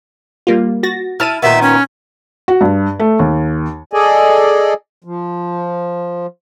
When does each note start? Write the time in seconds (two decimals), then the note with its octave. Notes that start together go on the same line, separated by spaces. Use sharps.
0.47 G3 A#3 F4
0.83 F#4 A6 A#6
1.20 E4 A5 F6 A6 D#7
1.42 A#2 D#3 B3 E5
1.62 C#4
2.48 F#4
2.61 G2
3.00 A3
3.19 D#2
3.93 G#4 A4 D5 D#5 G#5
5.04 F3